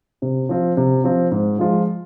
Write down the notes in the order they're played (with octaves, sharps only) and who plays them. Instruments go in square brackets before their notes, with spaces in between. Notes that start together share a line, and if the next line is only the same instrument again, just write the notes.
[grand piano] C3
F3 C4 F4
C3
F3 C4 F4
G#2
F3 G#3 F4